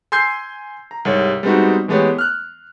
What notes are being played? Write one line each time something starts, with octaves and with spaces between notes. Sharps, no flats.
G#5 C6 E6 G6 G#6 C7
A#5
C2 G#2 C3 A4 C#5
G3 G#3 B3 C4 D#4 F#4
E3 G#3 A3 B3 G4 C#5
F6 F#6